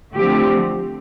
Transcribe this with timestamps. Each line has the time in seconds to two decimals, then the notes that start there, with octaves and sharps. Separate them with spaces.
0.16 D3 F3 A3 C4 G4